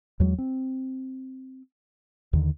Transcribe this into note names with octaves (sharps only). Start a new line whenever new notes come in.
E2 F#3 G#3
C4
D#2 D3 D#3